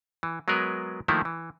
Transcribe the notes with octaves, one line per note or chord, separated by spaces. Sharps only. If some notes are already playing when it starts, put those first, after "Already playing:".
E3
F#3 G#3 B3 G#4 A#4 B4
D#3 F3 A3 A#3 E4
E3